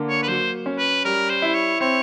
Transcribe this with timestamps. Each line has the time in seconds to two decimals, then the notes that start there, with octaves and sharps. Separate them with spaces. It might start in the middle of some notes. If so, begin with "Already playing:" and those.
Already playing: D3 A#3
0.09 C#5
0.23 B4
0.28 F#3 C5
0.66 C#4
0.78 B4
1.05 G3 A#4
1.30 C5
1.42 E4
1.54 C#5
1.80 C4 C#5